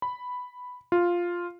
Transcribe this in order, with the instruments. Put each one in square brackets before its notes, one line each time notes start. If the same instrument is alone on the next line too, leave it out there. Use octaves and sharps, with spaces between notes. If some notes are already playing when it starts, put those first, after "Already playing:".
[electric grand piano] B5
F4